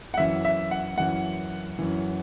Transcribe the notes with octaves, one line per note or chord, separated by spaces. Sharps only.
F#5
F#2 E3 E5
E5
F#5
F#2 E3 F#5
F#2 E3